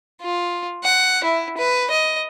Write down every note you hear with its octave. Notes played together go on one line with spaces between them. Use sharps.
F4
F#5
E4
B4
D#5